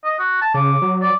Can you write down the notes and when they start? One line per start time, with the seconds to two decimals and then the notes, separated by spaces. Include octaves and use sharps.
0.04 D#5
0.19 F#4
0.42 A5
0.54 C#3 D6
0.82 F#3
1.01 D5